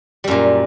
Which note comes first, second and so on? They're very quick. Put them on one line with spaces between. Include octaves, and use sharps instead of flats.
G3 F#2 A#2